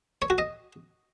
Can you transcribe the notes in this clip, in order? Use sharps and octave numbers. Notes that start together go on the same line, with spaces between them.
C#5
F#4
D#5